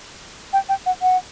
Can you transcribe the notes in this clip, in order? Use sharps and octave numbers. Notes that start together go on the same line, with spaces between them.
G5
G5
F#5
F#5